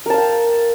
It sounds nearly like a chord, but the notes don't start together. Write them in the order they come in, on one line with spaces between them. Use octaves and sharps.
A#4 A5 F5 G5